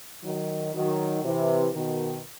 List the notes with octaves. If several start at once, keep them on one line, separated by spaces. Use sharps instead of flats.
D#3 F#3
D#3 F#3
C3 E3
B2 D#3